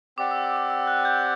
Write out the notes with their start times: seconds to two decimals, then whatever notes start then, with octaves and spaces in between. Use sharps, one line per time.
0.18 C4 G4 D5 F#5 D6
0.31 E6
0.44 E6
0.57 D6
0.70 E6
0.87 F#6
1.05 G6